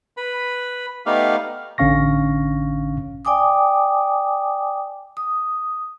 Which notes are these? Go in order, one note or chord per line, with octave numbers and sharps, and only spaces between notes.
B4 B5
A3 B3 D#4 G4 D5 F5
A1 D3 C#4 F5 C#6 A#6
D5 G5 G#5 D6 D#6
D#6